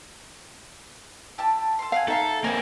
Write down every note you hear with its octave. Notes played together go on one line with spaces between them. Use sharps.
E4 G4 A5
A4 C6
C4 F5 F#5 G#5
D#4 A4 E5 F5 F#6
A#3 C4 B4 D#5 G#5